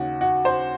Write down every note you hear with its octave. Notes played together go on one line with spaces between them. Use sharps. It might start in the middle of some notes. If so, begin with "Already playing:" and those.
Already playing: D#2 C#3 F#4
F#4
C5